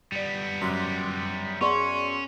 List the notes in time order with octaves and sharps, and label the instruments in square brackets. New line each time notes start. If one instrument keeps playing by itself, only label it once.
[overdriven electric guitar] G3 B3 [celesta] D5 C#7
[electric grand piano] F#2 [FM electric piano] C6 D6 F#6
[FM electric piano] B3 G#4 D5 [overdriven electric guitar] C#4 [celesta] F#5 C6 C#6